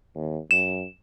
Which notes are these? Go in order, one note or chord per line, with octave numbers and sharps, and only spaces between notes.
D#2
F#2 E7